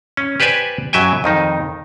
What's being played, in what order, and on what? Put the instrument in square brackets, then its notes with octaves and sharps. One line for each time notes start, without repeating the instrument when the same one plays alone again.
[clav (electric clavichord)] C#4
G4 B4 C5 D5 G#5
F#2 F#3 E5 G5 G#5
F2 D#3 D#4